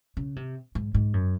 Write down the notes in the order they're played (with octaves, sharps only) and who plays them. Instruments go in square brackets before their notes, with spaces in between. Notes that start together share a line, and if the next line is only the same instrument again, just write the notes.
[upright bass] C#3
C3
G#2
G#2
F#2